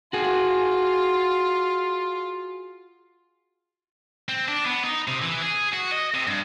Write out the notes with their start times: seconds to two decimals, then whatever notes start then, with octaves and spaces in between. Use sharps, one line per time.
0.13 F4 F#4 G#4
4.29 C4
4.49 D4
4.66 B3
4.84 D#4
5.08 C3
5.22 E3
5.42 G#4
5.73 F#4
5.92 D#5
6.14 C3
6.27 G2